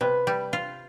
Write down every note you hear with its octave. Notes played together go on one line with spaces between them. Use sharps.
C3 B4
G3
F4